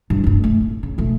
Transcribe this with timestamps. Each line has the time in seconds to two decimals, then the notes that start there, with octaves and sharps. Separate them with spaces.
0.10 G2 E3
0.24 F1 G2
0.44 A3
0.60 A2
0.83 C#3
0.98 E1 A3